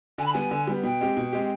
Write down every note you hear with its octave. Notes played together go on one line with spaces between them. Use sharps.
D3 G#5
B5
G3 B3 G#5
D3
G3 B3
B2 G5
G#3 C4 G4
B2
G#3 C4 G4